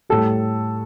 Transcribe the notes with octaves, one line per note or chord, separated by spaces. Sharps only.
A2 G3 A4